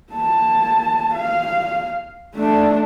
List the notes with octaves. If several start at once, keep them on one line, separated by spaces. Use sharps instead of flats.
A#3 A5
F5
A3 D4